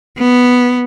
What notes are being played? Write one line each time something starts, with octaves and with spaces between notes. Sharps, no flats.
B3